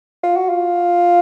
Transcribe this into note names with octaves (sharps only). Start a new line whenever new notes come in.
F4
F#4
F4